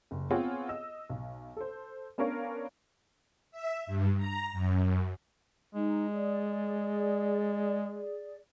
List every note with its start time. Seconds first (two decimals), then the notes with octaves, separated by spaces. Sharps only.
0.11 F#1
0.30 B3 C4 F4 G#4 C#5 F#5
0.69 D#5 E6
1.09 B1
1.57 A4 C5
2.18 B3 C#4 D4 A#4 C#5 F5
3.51 E5
3.87 G2
4.17 A#5
4.53 F#2
5.75 G#3 D#4
6.12 G#4 D5